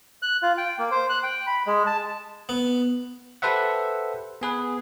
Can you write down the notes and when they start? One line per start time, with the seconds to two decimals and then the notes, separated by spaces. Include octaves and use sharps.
0.22 F#6
0.43 F4
0.58 G5
0.79 A#3
0.91 C5
1.09 F#6
1.23 G5
1.47 B5
1.67 G#3
1.87 A5
2.49 B3
3.42 G4 A4 B4 C5 E5 F#5
4.41 B3 G#4 B4